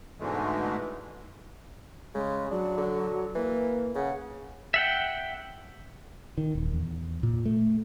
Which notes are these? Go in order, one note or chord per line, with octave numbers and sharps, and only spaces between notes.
G#2 B2 D3 E3 G#3 A3
C#3 G#3
F#3 D4
D3
E3 A#3
C#3 F#5
E5 F#5 G5
D#3
D#1
E2
A#2
A3